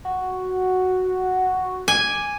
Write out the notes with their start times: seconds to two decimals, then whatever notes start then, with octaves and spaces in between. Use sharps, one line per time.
0.05 F#4
1.88 G#5 D6